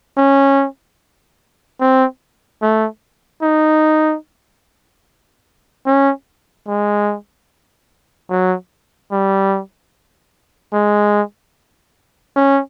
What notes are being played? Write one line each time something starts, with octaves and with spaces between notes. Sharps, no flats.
C#4
C4
A3
D#4
C#4
G#3
F#3
G3
G#3
C#4